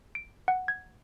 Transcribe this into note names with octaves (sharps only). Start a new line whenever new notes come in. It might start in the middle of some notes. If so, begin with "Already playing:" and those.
D7
F#5
G#6